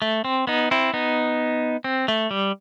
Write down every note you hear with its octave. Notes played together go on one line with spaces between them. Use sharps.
A3
C4
B3 D#4
C4 E4
B3 D#4
C4
A3
G3